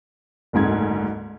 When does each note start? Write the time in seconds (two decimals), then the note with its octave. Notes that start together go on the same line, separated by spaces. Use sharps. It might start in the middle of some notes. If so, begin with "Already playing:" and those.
0.53 F#1 D2 G#2 G#6